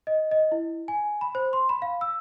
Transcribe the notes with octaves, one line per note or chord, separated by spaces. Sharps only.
D#5
D#5
E4
G#5
B5
C5
C6
B5
F5
E6